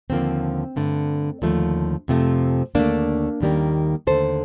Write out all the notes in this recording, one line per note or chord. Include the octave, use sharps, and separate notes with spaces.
D#2 D3 F3 A#3 C4
G2 D3 A3
D#2 D3 F3 A3
F2 C3 F3 A3
D#2 D3 A3 A#3 D4
D#2 D#3 G3 A#3
D#2 D3 A3 A4 C5